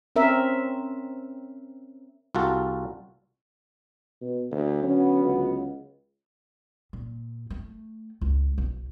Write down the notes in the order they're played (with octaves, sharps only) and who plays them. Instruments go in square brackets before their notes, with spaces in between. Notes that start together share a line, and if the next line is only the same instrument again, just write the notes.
[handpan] C4 C#4 A#4 E5
[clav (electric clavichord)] C2 F4 F#4 A4
[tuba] B2
D2
[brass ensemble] D3 F#3 B3 [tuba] C#4
[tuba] C#2
[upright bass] A#2
A3
C#2
B1